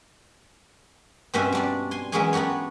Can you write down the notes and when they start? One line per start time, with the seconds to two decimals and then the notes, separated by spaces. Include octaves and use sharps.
1.34 G2 B2 C4 C#4 E5 G#5
1.52 G3 D4 D5
1.91 G#5 C6
2.12 E3 F#3 G#3 C#4 G#4 G#5
2.33 B3 D4 F#4 G4 C#5